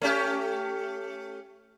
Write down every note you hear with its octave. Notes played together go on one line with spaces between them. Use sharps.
A3 C#4 G4